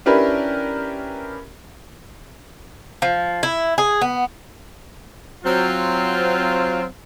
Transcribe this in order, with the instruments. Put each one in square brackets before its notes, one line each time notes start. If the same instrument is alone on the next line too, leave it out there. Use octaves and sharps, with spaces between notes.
[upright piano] C#4 D4 E4 G4 A#4 B4
[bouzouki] F3
E4
G#4
B3
[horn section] F#3 C4 F4